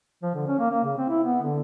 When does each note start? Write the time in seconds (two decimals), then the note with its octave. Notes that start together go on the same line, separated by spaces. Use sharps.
0.22 F3
0.35 D3
0.47 C#4
0.59 A#3
0.71 A#3
0.84 C#3
0.97 C4
1.09 E4
1.24 B3
1.43 D3